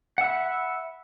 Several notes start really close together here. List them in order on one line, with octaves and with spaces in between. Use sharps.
F#5 E5 B5